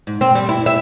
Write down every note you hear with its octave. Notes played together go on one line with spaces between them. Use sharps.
G#2
C4
G3
E4
E5